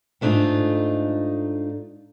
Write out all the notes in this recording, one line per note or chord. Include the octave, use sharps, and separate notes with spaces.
G#2 A3 D4 D#4 F4